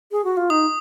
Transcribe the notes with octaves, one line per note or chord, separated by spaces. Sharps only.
G#4
F#4
F4
D#4 D#6